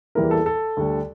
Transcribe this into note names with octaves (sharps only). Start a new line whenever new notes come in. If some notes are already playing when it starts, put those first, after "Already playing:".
E2 E3 G3 A#3 E4 A#4
A4
A4
D2 D3 G3 D4